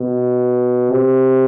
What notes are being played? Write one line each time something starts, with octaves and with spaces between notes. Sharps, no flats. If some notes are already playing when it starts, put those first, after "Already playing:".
Already playing: B2
C3